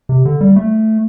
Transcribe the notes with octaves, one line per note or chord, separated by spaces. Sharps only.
C3
D3
G3
A3